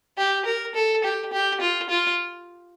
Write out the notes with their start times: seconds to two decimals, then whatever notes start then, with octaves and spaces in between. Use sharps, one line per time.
0.18 G4
0.45 A#4
0.75 A4
1.04 G4
1.33 G4
1.61 F4
1.90 F4